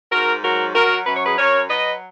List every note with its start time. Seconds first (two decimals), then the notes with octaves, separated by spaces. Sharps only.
0.12 G#2 F#4 A#4
0.44 F#3 F#4 A#4
0.75 F#3 F#4 A#4
1.06 F#2 B4
1.16 C#5
1.26 G#4 B4
1.38 F#2 A#4 C#5
1.70 F#3 B4 D#5